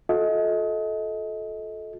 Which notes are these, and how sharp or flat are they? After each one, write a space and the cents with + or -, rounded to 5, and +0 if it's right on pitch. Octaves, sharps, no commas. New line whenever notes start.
F4 +45 A4 -15 D#5 +30